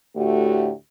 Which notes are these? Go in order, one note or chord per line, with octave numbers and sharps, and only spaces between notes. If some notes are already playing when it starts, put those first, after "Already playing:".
D2 A2 A3 F#4 G4